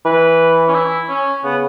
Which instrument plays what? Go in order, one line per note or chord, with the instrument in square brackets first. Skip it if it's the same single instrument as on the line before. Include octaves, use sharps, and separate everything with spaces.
[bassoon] E3 [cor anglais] B4
[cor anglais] C#4
E4
C#4
[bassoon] C#3 [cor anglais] B3